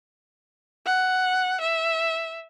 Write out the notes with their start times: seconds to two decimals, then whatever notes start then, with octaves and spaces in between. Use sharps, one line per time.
0.86 F#5
1.60 E5